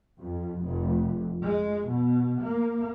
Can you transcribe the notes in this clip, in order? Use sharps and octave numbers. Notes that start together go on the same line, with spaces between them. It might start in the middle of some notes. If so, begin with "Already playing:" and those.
F2
F1
G#3
B2
A#3